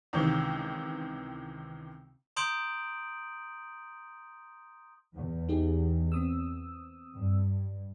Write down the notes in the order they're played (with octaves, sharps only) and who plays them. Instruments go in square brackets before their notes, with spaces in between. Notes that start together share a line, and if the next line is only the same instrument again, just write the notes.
[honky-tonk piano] C#2 C3 D#3 E3
[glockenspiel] A#5 C6 D#6 G6 D7 F#7
[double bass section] E2
[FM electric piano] D#4 G4 G#4
C4 D#6 E6
[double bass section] G2